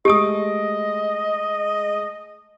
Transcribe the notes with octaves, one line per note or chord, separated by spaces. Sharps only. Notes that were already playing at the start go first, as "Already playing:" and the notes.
G#3 A3 G4 D#5 D#6 D7